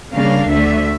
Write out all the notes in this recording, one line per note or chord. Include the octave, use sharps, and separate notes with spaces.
C#3 G3 A#3 D4 F5
D2 D3 A3 E5